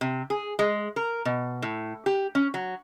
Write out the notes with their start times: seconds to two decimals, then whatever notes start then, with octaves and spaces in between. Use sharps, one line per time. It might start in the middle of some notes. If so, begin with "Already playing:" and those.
0.01 C3
0.30 G#4
0.59 G#3
0.96 A#4
1.25 B2
1.62 A2
2.06 G4
2.35 C#4
2.54 F#3